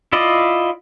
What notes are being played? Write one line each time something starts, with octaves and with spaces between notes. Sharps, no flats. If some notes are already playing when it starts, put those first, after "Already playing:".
E4 F4 D5 D#5